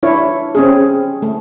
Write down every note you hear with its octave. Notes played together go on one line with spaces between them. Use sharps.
D4 E4 C#5
C4 C#4 G#4
A3